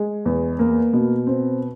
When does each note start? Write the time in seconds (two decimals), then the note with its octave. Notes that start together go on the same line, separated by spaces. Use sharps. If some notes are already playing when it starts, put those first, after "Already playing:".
Already playing: G#3
0.26 E2
0.59 A#3
0.93 B2
1.27 C4